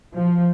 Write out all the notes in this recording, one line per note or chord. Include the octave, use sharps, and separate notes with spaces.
F3